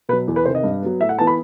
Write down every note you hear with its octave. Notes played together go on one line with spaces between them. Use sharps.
B2 F#3 B4
E2
B4
C3 D#3 C5
D#5
G2
F#3 B3
A2 E5
F#5
E3 B3 A5
B5